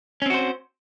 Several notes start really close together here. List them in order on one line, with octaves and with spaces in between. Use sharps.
C#4 C4 F#4 C5